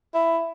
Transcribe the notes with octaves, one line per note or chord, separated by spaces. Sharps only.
E4